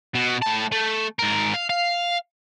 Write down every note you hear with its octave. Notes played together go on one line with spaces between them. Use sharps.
B2
A2 A5
A3
G#2 A#4
F5
F5